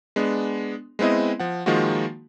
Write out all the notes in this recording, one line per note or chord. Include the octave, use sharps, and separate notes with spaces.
G#3 B3 D4
G#3 B3 C4 E4 D#5
F3 F#5
D#3 F3 G#3 A#3 F4 F#4